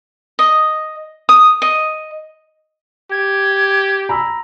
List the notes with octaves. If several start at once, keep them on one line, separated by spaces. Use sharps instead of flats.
D#5
D#6
D#5
G4 G#6
A#5 B5 E6